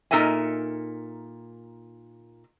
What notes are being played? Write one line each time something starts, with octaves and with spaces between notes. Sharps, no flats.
A#2 D#4 A4 A#4 E5 G#5